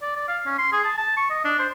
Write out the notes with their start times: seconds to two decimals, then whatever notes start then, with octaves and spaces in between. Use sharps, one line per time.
0.02 D5
0.16 D5
0.28 F5
0.46 C#4
0.59 C6
0.73 G#4
0.85 A5
0.98 A5
1.17 C#6
1.30 D#5
1.45 D4
1.60 C5